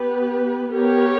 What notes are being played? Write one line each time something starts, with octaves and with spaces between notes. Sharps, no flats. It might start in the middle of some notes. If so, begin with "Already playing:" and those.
Already playing: B3 G4 B4
B3 G4 A#4 C#5